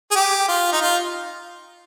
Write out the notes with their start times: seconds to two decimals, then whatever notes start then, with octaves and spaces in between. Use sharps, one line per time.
0.11 G#4
0.15 G4
0.48 F4
0.72 D#4
0.81 F4